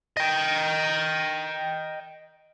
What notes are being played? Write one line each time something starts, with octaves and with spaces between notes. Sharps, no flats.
D#5 G5